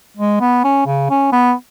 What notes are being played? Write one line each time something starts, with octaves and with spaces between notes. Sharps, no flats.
G#3
B3
C#4
C#3
C#4
B3